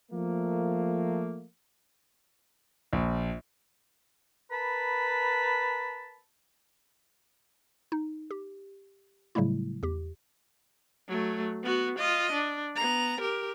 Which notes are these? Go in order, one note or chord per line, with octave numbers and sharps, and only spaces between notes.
F3 A3 A#3
A#1
A#4 B4 A5 B5
D#4
G4
A2 C#3 F#3 G3 A3 E4
E2 G4
F#3 A3
B3 F#4
F4 D#5
D4
B3 A#5
G4 A#4